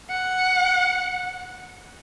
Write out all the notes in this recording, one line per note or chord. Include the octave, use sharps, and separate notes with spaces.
F#5